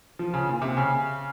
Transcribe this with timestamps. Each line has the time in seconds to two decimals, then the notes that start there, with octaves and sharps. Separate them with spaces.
0.19 F3
0.34 C#3
0.48 A#2
0.62 C3
0.77 C#3